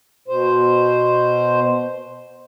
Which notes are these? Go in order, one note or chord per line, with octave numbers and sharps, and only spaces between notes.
B2 C5